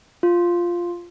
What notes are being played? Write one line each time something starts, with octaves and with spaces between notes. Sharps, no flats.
F4